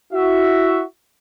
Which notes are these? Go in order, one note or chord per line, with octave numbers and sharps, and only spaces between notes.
E4 F#4 E5